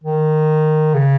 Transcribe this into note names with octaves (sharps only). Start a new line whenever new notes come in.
D#3
C#3